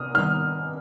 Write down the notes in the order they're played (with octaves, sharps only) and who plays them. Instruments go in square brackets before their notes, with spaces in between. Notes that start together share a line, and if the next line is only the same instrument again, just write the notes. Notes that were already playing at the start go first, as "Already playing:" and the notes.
Already playing: [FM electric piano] C3 [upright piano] D#6 F6
[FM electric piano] D#3 G3 C4 D#4 [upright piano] F6